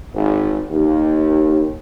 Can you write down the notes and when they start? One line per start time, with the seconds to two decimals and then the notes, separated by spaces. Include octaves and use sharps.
0.13 G#1
0.70 D#2